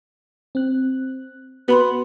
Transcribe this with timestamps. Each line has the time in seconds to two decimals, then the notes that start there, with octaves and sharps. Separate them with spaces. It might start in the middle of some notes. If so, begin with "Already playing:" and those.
0.55 C4 F#6
1.68 B3 F#4 B4 B5 C6